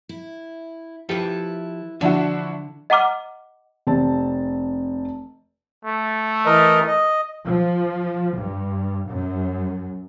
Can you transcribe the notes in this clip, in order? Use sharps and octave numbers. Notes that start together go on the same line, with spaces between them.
E4
F3 E4 G4 A4 B4
D3 F3 D4 E4 F#4
D#5 F#5 A#5 D6 F6
F1 C4 A5
A3
E3 A#4 D#5
D#5
F3
G2
F#2